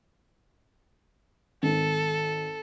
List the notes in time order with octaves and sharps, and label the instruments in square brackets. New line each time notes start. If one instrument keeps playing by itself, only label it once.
[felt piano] G#1 [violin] A4